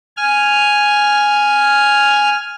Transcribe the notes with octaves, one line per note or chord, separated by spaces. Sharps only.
G#5 F6